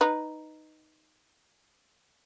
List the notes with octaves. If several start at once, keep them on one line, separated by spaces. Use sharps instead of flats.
D#4 B4